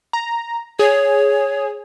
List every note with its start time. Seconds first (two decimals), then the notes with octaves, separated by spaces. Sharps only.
0.13 A#5
0.79 G#4 C#5